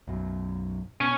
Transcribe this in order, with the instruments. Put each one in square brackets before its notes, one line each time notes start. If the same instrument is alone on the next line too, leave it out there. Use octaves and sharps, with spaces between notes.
[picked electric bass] B1 F#2
[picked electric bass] B2 [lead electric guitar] C#4